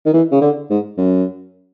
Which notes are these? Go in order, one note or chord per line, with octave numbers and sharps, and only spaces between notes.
D#3
E3
C#3
D3
G#2
F#2